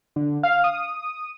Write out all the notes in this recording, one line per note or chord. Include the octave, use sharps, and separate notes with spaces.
D3
F5
D#6